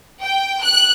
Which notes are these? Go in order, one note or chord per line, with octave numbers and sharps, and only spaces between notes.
G5
F#6